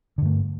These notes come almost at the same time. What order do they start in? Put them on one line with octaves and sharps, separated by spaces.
D3 G2 A3